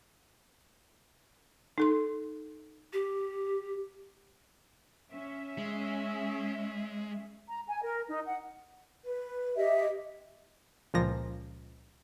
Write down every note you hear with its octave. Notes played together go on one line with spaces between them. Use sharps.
D#4 A4 C6
G4
C#4 E5
G#3
A#5
G#5
A#4
D#4
F#5
B4
G4 D#5 E5
C#2 A#2 F3 A#6